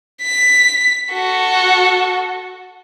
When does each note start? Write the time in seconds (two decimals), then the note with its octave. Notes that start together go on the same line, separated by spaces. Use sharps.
0.23 B6
1.12 F#4 A4